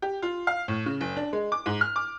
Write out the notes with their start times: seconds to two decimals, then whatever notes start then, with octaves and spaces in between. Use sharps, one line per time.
0.02 G4
0.22 F4
0.47 F5
0.68 A2
0.86 C#3
1.01 F#1
1.17 D4
1.33 G#3
1.52 D6
1.66 G#2
1.81 F6
1.96 D6